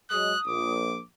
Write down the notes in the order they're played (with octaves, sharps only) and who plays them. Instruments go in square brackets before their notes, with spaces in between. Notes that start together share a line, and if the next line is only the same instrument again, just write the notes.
[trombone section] F#3 G#3 [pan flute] D#6 [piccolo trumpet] F#6
[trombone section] A#1 [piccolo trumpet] D6